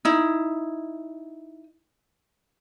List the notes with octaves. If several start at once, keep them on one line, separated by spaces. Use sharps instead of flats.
D#4 E4